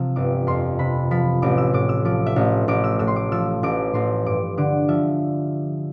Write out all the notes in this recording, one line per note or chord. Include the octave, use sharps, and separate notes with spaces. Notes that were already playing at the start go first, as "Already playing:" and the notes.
Already playing: C3 F3 E6
G1 D6
F2 C6
C3 B5
F3 B5
A1 D6
E6
A2 D6
E6
F3 D6
E5
A1
A1 D6
E6
A2 E6
C6
D6
F3 E6
A1 D6
A1 C6
G2 D6
D3 D6
F3 E5